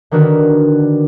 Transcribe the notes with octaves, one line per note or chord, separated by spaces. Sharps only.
D3 D#3 D4 F#4 A#4 B4